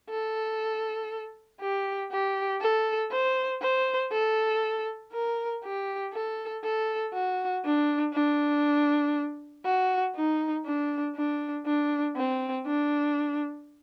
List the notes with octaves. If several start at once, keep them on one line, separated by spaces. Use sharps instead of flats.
A4
G4
G4
A4
C5
C5
A4
A#4
G4
A4
A4
F#4
D4
D4
F#4
D#4
D4
D4
D4
C4
D4